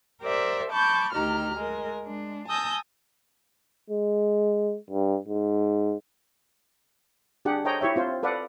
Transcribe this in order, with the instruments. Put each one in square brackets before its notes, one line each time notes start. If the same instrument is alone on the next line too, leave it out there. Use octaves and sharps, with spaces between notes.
[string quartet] G4 A#4 C5 D5 E5
A5 B5 C#6 D6 G6
D2 D#3 G4 A#5 F6
G#3 A#4
G#3 D4
G#5 A5 D#6 E6 G6 A#6
[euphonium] G#3
G2
G#2
[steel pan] D4 G4 G#4 F#5
A4 C5 C#5 D#5 G5 A#5
E4 G4 C#5 E5
C4 F4 C5
A4 B4 D5 F5 F#5